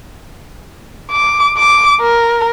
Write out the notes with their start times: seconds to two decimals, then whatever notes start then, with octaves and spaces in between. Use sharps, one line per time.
1.11 D6
1.58 D6
2.01 A#4